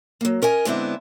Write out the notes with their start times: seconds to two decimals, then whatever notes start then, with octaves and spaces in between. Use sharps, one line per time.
0.21 F#3 A#3
0.42 C#4 A#4 D#5 G#5
0.65 D3 G#3 B3 C4 D4 E4